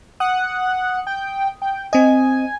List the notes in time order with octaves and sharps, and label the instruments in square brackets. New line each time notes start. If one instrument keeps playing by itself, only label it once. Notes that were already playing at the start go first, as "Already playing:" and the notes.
[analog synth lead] F#5 [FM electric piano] D#6
[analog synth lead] G5
G5
[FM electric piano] C4 D#5 [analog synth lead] G#5